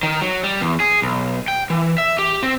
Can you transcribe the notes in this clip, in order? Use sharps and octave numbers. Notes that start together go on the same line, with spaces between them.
D#3
F#3
G3
E2
G#4
B1
G5
E3
E5
G4
C4